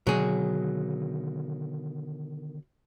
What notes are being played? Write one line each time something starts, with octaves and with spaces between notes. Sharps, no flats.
B2 D3 D#3 F#3 G#4